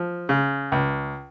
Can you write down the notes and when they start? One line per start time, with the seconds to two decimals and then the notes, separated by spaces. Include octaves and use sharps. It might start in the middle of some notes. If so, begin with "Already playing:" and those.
Already playing: F3
0.29 C#3
0.72 C#2